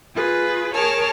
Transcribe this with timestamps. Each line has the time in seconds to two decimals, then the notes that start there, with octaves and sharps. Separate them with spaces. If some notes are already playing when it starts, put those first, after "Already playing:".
0.16 F4 G#4 B4
0.74 G#4 A#4 C#5 A5 F6